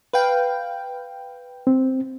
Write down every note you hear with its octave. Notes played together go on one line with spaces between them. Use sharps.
B4 F5 G5
C4